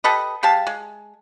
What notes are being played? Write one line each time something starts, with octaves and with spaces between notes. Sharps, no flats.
G4 A4 B4 D#5
G#3 G4 F5 A5
G#3